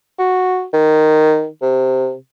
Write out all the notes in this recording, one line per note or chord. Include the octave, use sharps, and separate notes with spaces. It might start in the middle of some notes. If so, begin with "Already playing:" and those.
F#4
D#3
C3